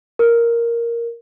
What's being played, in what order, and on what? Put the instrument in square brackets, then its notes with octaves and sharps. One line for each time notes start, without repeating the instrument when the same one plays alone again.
[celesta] A#4